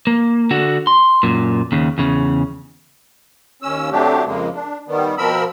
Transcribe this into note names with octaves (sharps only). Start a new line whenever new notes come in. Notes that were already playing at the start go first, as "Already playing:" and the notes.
A#3
D3 F#4
C6
F#2 A#2
D#2 C#3
E2 C#3
D#2 C#4 E6
C3 F#3 A3 D4 G4
F2 C#3 G#3 A#3
D4
D#3 G3 B3
B2 F3 C4 A#4 B5 E6